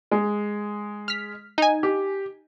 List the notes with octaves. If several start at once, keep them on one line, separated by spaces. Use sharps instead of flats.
G#3
F6 B6
D#4 G#5
G4